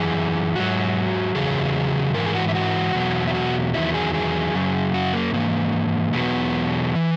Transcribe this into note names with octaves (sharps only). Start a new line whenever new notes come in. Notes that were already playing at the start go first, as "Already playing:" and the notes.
Already playing: F#2 E3 G#4
G#2 F#3 F#4
E2 C#3 F#3 G#4
G#2 E3 A#4
G#4
F#4
E4
F#4
E2 B2 F#3
E4
F#4
E2 D#3 F#3 E4
G#4
G#4
F#2 C#3 F#3
F#4
A#3
G#2 E3 A#3
E2 B2 F#3 B3
E3